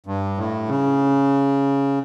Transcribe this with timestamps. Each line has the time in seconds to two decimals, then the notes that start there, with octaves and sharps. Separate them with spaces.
0.06 G2
0.37 A2
0.69 C#3